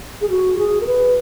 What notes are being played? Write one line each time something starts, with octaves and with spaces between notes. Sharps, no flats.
G#4
F#4
G#4
A#4
B4